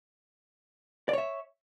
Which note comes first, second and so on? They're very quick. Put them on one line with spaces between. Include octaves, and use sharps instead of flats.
D5 C#5 E5